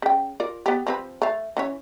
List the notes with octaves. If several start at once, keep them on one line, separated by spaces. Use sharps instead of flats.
C#3 G5
F4 A#4 D5
B3 G4
F3 C4 B4
A3 F5
E3 C#4 C#5